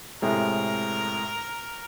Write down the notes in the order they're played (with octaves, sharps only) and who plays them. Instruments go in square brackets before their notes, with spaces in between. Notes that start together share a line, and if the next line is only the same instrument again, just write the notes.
[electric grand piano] A2 C3 G#3 [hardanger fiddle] A#4